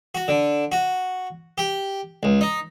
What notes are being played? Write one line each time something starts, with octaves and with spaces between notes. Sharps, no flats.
F#4
D3
F#4
G4
C#2
D#4